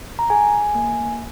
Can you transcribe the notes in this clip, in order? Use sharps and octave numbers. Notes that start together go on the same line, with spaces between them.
A#5
G#4 G#5
A#3